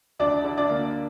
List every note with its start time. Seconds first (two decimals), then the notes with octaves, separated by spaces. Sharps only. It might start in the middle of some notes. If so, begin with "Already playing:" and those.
0.19 D2 D4 D5
0.44 D3
0.58 D4 D5
0.70 A#3